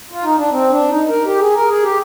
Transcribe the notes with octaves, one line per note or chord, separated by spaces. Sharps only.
F4
D#4
D4
C4
D4
D#4
A#4
G4
G#4
A#4
G#4
G4